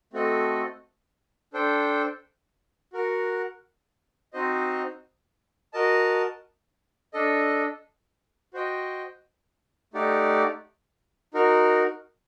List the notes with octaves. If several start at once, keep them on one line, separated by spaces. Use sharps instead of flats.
A3 C4 F#4 A4 D#5
D4 A4 C5 G5
F#4 A#4 F#5
C4 D#4 F#4 C5 D#5
F#4 A#4 D#5 A5
D4 A4 D#5
F#4 C5 D#5 G5
A3 D#4 G4 D5 F#5
D#4 F#4 A#4